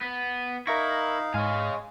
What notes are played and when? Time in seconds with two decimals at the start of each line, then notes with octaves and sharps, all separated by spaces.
0.01 B3
0.67 D#4 E4 A#4 E5 F5 C#6 A#6
1.34 G#2 G#3 C#5 F5 G#5